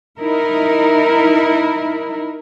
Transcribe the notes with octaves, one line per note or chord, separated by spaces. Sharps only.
D#4 E4 A#4